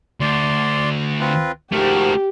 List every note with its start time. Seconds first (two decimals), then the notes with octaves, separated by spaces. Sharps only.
0.21 D2 D5 C6
1.20 C4 F4 B4
1.73 G#2 F3 A3 F#4 G4 A#4